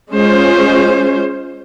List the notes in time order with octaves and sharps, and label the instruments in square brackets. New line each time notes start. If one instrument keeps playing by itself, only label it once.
[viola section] G#3 C#4 F4 C5